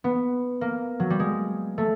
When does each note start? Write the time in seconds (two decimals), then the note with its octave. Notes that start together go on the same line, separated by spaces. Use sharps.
0.04 B3
0.61 A#3
1.00 F#3
1.10 G3
1.20 G#3
1.78 A3